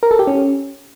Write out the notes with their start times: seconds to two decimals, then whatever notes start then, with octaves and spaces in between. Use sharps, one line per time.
0.03 A#4
0.11 A4
0.19 G4
0.27 C#4